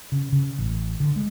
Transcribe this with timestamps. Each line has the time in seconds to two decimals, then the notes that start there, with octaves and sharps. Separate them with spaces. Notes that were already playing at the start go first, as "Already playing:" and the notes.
0.12 C#3
0.32 C#3
0.59 A1
1.00 D3
1.16 G#3